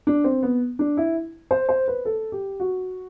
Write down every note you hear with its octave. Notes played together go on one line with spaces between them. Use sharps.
D4
C4
B3
D4
E4
C5
C5
B4
A4
G4
F#4